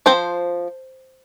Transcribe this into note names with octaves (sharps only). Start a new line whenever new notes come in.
F3 C4 C5